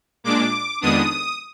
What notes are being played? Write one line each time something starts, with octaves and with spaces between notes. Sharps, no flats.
A#2 G#3 D4 D6
F2 D#3 G#3 B3 D4 D#6